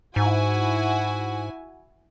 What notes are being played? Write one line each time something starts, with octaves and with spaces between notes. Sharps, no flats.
G#2 E4 F#4 G#5